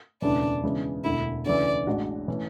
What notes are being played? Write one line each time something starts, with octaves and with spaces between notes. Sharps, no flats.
E1 D2 C#3 E3 D4
C#3 E3 G#3 B3
E1 D2 D3 E4
D2 C#3 E3 D5
A1 A2 G#3 D4 F#4
E3 A3 C#4